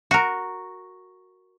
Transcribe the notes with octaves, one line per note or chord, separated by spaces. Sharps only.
F#4 A#4